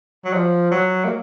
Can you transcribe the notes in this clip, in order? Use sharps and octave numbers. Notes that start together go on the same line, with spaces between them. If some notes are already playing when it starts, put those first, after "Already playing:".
F#3
F3
F#3
A#3